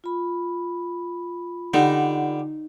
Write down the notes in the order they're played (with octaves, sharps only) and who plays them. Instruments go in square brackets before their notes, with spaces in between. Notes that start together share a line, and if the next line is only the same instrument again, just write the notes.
[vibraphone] F4 B5
[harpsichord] D3 G3 [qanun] D#4 [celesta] F#5